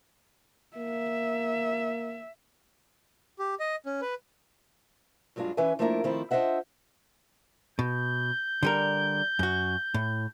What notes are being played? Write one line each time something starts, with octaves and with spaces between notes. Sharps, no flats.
A#3 E5
G4
D#5
C#4
B4
G2 F#3 G#3 D4 F4
E3 C#4 B4 E5 G#5
F3 A3 A#3 D4 E4 A#4
D#3 F3 A3 C4 E4 F4
D4 F4 C5 D#5 E5 F#5
B2 G6
D3 G3 A#4
F#2 F#4
A2